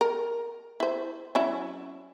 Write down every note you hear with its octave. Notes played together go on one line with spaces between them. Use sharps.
A#4
E4 C5
F#3 C#4 E4